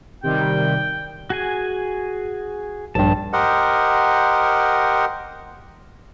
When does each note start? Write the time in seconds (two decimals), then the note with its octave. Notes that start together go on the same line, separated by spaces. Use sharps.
0.23 C3 D#3 G3 G5
1.30 F#4 G#4 G#5
2.95 A#1 G2 A5
3.33 G4 A#4 C5 D#5 F#5